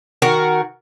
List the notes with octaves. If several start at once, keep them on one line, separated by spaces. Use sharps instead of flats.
D#3 F#4 A#4